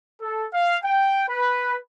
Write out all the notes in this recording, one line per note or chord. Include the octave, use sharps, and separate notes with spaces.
A4
F5
G5
B4